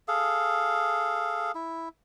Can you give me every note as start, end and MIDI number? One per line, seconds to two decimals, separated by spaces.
0.08 1.52 68
0.08 1.52 69
0.08 1.52 77
1.55 1.89 64